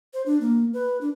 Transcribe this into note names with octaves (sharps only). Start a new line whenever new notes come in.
C5
D4
A#3
B4
D4